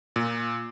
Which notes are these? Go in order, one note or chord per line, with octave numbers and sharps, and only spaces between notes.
A#2